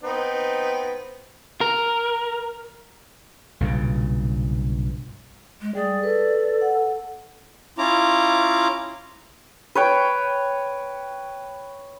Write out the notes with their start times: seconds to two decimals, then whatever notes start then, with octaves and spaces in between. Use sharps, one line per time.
0.03 B3 C4 D#4
1.61 A#4
3.60 B1 G2 A#2 C#3
5.61 G#3
5.75 G3 G#4 D5
6.03 A4 B4
6.62 F#5
7.78 C#4 E4 F4 A#5 D6
9.75 B4 C#5 G5